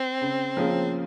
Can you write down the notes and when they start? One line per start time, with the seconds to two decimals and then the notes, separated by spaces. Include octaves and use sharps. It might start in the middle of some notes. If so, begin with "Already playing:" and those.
Already playing: C4
0.21 C#3
0.57 F3 A#3 C#4 G#4